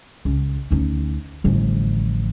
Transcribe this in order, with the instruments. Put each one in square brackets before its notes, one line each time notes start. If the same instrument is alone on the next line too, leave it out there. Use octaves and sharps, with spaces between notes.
[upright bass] C#2
[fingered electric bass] D2 [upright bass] C#4 D#4
[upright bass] A1 F3 [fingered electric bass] D3 G3